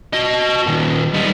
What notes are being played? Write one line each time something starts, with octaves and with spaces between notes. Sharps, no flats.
F#4 D#5
A#2 D#3
G3 D#4